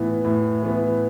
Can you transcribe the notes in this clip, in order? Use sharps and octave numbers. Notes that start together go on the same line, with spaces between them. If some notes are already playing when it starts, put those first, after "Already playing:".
Already playing: A2 E3 B3
A2
E3 B3